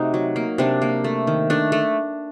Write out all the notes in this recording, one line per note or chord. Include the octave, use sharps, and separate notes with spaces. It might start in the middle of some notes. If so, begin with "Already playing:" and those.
Already playing: C3 A3 D#4 F#4
F#3
A#3
C3 D4
A#3
A3
D#3
A3 D4
A3